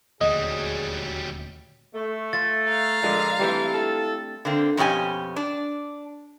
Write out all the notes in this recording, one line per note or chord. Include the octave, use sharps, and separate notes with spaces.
D#1 D2 F#3 G3 G#4 D#5
A3
F4 E5 A6
F5 A#5
A#2 D3 F3 G#3 D4
E3 G3 A3 C4
E4 F4 A4
D3 A#3 C4
F2 B2 C#4 G4 G#5
D4